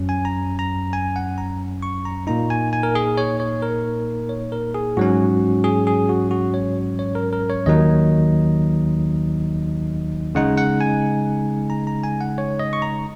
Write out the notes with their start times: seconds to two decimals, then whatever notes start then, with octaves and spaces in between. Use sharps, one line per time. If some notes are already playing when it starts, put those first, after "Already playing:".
Already playing: F#2 F#3 C#4
0.09 G#5
0.25 A#5
0.59 A#5
0.93 G#5
1.16 F#5
1.38 A#5
1.83 C#6
2.05 A#5
2.27 A#2 A#3 D#4 A#5
2.50 G#5
2.73 G#5
2.83 A#4
2.95 G#4
3.18 C#5
3.40 C#5
3.63 A#4
4.29 C#5
4.52 A#4
4.75 G#4
4.97 G#2 F#3 C#4 F#4
5.64 G#4
5.87 G#4
6.09 F#4
6.31 F#4
6.54 C#5
6.99 C#5
7.15 A#4
7.33 A#4
7.50 C#5
7.66 D#2 D#3 F#3 D#4 D#5
10.35 C#3 G#3 D#4 F#5
10.58 F#5
10.81 G#5
11.70 A#5
11.87 A#5
12.03 G#5
12.21 F#5
12.38 C#5
12.59 D#5
12.73 C#6
12.82 A#5